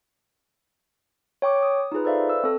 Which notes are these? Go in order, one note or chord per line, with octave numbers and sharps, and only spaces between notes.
C#5 G5 C#6 D6
D#6
D#4 F4 G#4 B4
A4 B4 C5 D5 E5 F5
E6
C4 A4